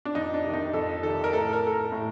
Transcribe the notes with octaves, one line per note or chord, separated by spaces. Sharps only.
D4
F2 D#4
D4
C3 D#3
D#4
F2 A4
C3 D#3 A4
A#4
A2 A4
A#4
A4
A#4
A2